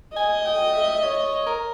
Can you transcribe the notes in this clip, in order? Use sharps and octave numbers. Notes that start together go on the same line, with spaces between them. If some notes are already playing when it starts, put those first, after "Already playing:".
D#5 G#5
G5
E5
C#5
A#4